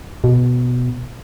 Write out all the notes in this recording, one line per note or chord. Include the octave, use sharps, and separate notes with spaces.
B2